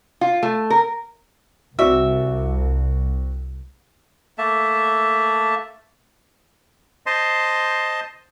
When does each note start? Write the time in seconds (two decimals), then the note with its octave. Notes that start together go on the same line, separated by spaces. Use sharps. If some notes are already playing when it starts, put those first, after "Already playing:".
0.21 F4
0.43 A3
0.70 A#4
1.79 C2 C4 F#4 D5 E5
4.38 A3 A#3 E5 A5
7.06 C5 D#5 A5 C6